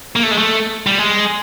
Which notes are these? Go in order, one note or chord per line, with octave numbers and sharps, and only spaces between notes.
A#3
A3
G#3
A3
G3
G#3